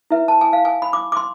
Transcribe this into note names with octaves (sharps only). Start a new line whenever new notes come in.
E4 B4 E5
A5
G#5
F5
G#5
B5
D6
D6
C6